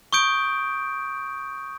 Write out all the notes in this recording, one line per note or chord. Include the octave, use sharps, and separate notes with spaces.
C#6 D#6 G6 D7